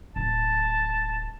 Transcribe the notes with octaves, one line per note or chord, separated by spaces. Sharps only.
D1 A5